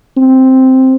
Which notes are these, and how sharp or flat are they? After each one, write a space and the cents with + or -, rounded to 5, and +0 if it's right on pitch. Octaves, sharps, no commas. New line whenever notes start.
C4 +0